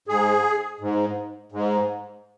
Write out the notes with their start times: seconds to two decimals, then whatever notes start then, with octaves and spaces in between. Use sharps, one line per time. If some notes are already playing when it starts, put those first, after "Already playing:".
0.08 G#2 G#4
0.81 G#2
1.52 G#2